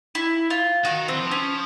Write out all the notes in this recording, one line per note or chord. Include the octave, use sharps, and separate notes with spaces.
E4
F4
D#3 F#4
E3 C4
F3
C#4